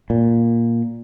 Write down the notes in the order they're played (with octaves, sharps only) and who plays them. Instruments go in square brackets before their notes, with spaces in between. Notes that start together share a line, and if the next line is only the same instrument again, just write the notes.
[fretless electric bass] A#2